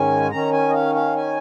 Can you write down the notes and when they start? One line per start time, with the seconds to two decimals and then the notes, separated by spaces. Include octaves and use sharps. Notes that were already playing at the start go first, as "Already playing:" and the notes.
Already playing: G#2 D#3 G#3 C#4 G#5
0.31 D#3 C#4 A#5
0.52 G#5
0.69 D#5
0.74 F5
0.95 F5
1.16 G#5